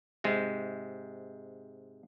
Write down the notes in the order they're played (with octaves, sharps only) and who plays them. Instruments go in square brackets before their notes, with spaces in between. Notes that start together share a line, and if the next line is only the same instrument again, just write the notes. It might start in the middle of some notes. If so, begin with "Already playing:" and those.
[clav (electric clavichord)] G#2 C3 G#3